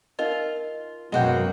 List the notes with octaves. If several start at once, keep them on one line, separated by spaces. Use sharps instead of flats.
D#4 F4 A#4 D#5
F#2 B2 F#3 G#3 A#3 B3 F#4 G5